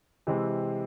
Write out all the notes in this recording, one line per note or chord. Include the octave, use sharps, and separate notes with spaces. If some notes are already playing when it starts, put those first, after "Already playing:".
C3 E3 G#3 C4